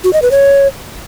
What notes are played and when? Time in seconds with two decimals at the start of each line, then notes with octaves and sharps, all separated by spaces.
0.04 F#4
0.13 D#5
0.22 B4
0.31 C#5